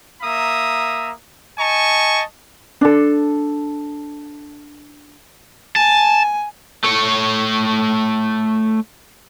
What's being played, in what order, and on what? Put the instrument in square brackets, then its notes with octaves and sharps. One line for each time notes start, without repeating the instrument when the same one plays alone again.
[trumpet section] A#3 E5 A#5 D#6
D#5 G#5 A5 C#6
[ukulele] D4 A4
[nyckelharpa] G#5 [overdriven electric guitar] A5
[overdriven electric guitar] A3 C#5